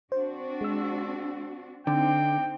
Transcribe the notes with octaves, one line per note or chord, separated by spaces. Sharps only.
C4 D4 F#4 C5
G#3 E6
D3 C4 D#4 G5 D6